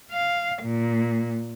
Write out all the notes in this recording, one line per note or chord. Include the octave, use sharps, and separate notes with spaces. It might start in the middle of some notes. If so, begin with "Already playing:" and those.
F5
A#2